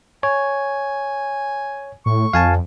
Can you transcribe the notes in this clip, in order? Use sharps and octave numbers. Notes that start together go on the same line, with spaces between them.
C#5 G#5
A2 C#6
F2 F5 G#5 A5